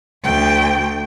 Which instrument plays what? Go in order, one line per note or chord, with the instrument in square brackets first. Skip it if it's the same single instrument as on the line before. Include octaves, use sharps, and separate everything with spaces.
[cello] D2 G5